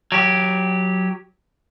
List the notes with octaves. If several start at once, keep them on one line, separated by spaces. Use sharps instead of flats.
F#3 G4